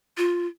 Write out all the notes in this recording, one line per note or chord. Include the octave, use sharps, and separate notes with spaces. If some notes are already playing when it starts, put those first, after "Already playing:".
F4